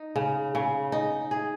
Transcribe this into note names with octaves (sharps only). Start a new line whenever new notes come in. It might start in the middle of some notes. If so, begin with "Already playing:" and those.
Already playing: D#4
C#3
C#3
D#4
G#4